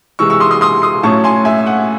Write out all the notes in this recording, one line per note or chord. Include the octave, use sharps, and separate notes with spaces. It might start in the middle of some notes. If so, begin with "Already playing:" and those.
C3 E3 G#3 C#6 E6
C#6 E6
C6 D#6
C6 D#6
C6 D#6
C6 D#6
A2 F#3 A3 C#4 A5 C#6
G#5 C6
E5 G#5
F#5